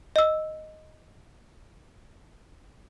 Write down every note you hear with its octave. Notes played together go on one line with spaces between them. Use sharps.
D#5 E6